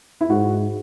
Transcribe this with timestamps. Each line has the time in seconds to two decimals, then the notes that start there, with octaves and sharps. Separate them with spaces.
0.21 E4
0.30 G#2 F#4